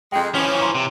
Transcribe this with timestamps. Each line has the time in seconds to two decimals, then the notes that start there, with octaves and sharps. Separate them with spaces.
0.12 F2 G#3 G5
0.34 E3 F3 C#4 B6
0.61 A#5 C6
0.75 C3